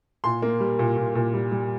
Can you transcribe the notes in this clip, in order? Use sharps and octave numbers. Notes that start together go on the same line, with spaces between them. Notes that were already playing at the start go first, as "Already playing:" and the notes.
A#2 C6
A#3
G3
A#2
A#2
A#2
G3
G3